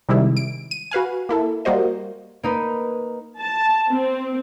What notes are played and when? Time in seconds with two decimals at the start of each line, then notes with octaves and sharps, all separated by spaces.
0.09 C3 D#3 G3 G#3 E4
0.37 D7
0.71 D#7
0.91 F#4 B4 F5 G#5
1.29 A#3 E4 A4
1.65 G3 A#3 F#4 C5 D#5
2.43 A#3 D#4 B4
3.40 A5
3.90 C4